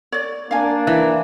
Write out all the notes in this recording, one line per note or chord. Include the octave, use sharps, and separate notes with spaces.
C#5 D5
A#3 D4 F5 G#5
E3